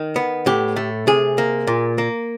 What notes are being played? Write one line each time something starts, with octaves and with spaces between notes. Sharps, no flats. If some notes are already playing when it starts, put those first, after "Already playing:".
Already playing: D#3
B3
A2 G4
A3
C3 G#4
A#3
A#2
A#3